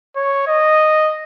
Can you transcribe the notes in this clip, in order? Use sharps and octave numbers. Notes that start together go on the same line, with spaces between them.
C#5
D#5